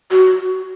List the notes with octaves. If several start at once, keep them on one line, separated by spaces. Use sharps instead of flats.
F#4